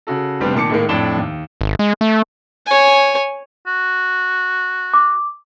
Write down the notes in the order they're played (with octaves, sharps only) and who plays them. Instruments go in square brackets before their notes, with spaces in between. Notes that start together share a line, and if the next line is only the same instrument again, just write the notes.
[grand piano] C#3 F#4 A4
F1 G3 B3 C4 D4
A#2 D#3 A5 D6 C#7
A2 D#3 G#3 A#3
F2 A2 D4 E7 G7
D#2
[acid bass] G#1
G#3
A3
[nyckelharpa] C#5 G#5
[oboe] F#4
[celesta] D6